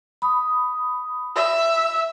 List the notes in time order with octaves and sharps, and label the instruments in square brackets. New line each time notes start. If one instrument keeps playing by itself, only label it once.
[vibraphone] B5 D#6
[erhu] E5